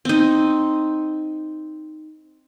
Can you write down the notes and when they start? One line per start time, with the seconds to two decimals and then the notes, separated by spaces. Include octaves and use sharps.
0.05 C4 D#4